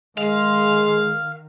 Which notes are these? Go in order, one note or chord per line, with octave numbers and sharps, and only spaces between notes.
D#3 G#3 F5